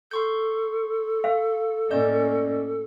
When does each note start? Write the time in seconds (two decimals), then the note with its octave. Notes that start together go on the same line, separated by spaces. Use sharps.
0.11 A4 C6 C#6 G6
1.24 F5
1.91 A2 A#3 C#4 D5 D#5 G6